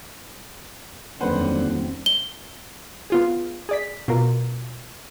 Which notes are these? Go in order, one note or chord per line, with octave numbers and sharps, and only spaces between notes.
D#1 F2 D3 F#3 C4 B4 C5 F#5
G7
B3 F4 G#4
G#4 D5 B6
B2 F4 A#4